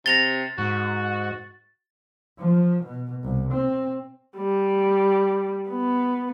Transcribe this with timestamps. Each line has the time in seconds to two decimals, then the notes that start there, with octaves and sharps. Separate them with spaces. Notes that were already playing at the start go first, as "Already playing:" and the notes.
0.06 C3 A6 A#6 F7 G7
0.58 G#2 F#4
2.40 F3
2.83 B2
3.23 C2
3.52 C4
4.37 G3
5.70 B3